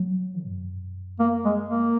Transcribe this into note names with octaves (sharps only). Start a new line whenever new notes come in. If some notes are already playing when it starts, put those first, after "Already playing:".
Already playing: F#3
F#2
A#3
G#3
A#3